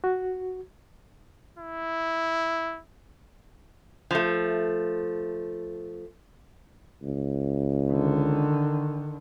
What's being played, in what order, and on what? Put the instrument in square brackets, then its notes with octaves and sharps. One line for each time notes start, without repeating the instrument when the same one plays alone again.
[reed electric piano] F#4
[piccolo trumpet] E4
[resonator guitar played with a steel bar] F3 A3
[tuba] C#2
[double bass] D3 D#3